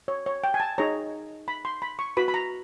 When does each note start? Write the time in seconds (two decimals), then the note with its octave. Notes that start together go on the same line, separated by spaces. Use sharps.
0.08 C#5
0.26 C#5
0.44 G5
0.54 G#5
0.60 A5
0.78 D#4 G#4 C#5 A#5
1.48 B5
1.65 C6
1.82 B5
1.99 C#6
2.17 F#4 B4 B5
2.28 B5
2.34 A#5